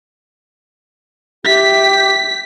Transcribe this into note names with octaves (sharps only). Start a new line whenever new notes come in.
G4 E5 B6